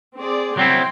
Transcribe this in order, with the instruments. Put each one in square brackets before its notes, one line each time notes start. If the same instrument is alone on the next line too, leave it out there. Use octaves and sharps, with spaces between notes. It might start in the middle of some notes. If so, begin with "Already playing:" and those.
[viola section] C4 G#4 D5
[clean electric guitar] F#3 C4 E4 [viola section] G5 C6